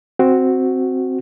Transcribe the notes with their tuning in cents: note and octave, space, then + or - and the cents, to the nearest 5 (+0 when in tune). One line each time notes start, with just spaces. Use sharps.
C4 +0 F#4 +0